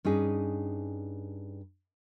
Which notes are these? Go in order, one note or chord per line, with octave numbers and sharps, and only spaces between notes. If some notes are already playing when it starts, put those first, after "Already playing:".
G2 C#4 D#4 G#4